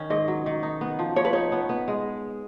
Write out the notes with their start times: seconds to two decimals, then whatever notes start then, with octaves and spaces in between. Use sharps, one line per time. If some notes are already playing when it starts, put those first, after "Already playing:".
Already playing: D#3 C#4
0.10 G#2 D#5
0.28 F#3
0.46 D#3
0.63 D#4
0.81 B3
0.99 F3
1.16 F3 C#5
1.25 B4
1.33 D#4 C#5
1.52 B3
1.69 B3
1.88 G#3